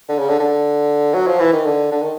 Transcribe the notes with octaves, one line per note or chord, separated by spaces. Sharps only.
D3
C#3
D3
D3
F#3
F3
E3
D#3
D3
D3
D#3